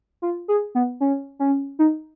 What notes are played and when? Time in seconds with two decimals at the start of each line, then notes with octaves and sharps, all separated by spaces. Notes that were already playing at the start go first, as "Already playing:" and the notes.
0.22 F4
0.48 G#4
0.75 B3
1.00 C#4
1.39 C#4
1.79 D#4